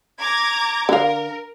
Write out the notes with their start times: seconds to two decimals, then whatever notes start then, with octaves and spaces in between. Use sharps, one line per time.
0.20 A#5 D6 G#6
0.89 D3 A#4 F5